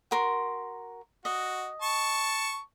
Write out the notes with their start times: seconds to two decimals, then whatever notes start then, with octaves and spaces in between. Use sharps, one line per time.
0.11 F#4 A#4 C6
1.25 F#4 D#5
1.82 A5 C#6